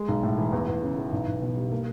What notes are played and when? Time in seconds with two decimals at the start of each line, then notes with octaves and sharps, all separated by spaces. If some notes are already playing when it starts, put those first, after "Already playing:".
Already playing: G#3
0.08 B1
0.23 A2
0.38 E3
0.53 E2
0.68 E2
0.83 C#3
0.98 E3
1.12 B1
1.27 B1
1.42 B2
1.56 G3
1.71 A#3